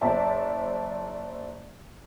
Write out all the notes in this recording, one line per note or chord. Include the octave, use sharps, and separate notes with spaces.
F#1 C5 D5 E5 A5